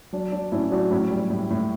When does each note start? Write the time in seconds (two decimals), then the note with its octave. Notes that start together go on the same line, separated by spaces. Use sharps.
0.13 F#3 D4
0.32 F#3 D4
0.52 A2 C#4 E4
0.71 F#3 D4 F#4
0.91 A2 C#4 E4
1.11 G3
1.30 A2
1.50 A2